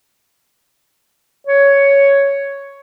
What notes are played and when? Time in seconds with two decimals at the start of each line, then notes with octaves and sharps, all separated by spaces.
1.47 C#5